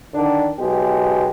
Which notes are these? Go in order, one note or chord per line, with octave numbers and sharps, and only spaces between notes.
D3 D#3 D4
B1 B2 G#3 G4